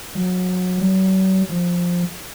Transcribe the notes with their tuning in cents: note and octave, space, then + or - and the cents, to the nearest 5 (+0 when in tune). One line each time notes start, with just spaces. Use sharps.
F#3 -25
F#3 +40
F3 +10